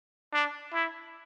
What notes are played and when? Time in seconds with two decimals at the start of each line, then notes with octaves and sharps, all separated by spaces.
0.33 D4
0.74 E4